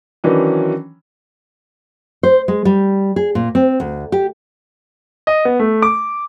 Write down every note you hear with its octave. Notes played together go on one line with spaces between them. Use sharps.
D#3 E3 F#3 C#4 D4
C5
G#3
G3
G#4
A#2
C4
D2
G4
D#5
B3
A3
D6